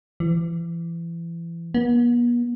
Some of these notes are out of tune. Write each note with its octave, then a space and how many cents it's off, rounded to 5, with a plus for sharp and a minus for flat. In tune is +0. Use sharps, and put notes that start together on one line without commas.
E3 +30
B3 -45